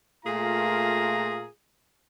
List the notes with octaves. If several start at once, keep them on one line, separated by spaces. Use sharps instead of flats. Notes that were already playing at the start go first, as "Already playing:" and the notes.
A#2 A3 F4 G#4 A#4 A#5